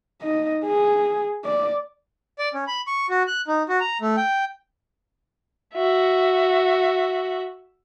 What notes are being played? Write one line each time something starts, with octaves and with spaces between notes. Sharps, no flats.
D#4 D#5
G#4
D5
D5
C#4
B5
C#6
F#4
F#6
D#4
F#4
A#5
A3
G5
F#4 E5